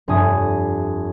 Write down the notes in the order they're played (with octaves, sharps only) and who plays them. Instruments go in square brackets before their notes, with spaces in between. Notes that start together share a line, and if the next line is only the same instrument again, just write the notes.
[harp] F1 G2 G#5 D#6